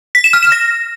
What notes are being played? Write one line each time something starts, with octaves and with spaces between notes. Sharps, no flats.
B6
E7
F6
E7
A#6